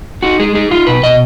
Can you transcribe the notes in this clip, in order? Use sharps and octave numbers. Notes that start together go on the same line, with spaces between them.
D#4 F#4
G#3 G#4
D#4 G#4
D#4 F4
B2 B4
B2 D#5